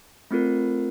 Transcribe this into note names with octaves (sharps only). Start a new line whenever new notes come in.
A3 C4 F4 A#4